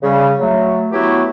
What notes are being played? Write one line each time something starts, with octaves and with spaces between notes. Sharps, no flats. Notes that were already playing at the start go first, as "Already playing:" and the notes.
C#3 G3
F#3 A3
E3 F#3 A3 B3 E4 G4